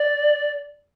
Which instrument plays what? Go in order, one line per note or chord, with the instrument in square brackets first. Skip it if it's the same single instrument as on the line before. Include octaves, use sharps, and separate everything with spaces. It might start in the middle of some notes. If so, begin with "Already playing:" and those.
Already playing: [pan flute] D5